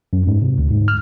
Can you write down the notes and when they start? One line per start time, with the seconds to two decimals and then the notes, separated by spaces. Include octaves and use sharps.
0.13 F#2
0.27 G#2
0.42 C3
0.58 D2
0.71 G#2
0.88 F6